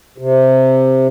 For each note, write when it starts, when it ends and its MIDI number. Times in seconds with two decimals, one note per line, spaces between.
0.18 1.07 48